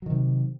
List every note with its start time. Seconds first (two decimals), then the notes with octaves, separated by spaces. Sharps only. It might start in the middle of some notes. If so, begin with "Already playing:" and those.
0.02 F#3
0.06 D#3
0.10 C3